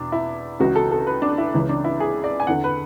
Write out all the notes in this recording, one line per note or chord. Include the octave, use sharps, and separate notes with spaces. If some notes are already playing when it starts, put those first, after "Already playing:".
Already playing: E2 B2 D4
E4
C#2 C#3 E3 F#4
A4
A4
B4
D4
E4
C#2 C#3 E3
D4
E4
G#4
D5
G#5
E2 D3 F#5
B4